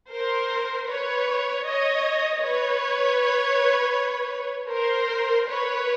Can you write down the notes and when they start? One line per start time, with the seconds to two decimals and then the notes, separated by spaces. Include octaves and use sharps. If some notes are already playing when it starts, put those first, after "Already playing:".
0.13 A#4 C5
0.89 B4 C#5
1.65 C#5 D#5
2.42 B4 C#5
4.71 A#4 C5
5.47 B4 C#5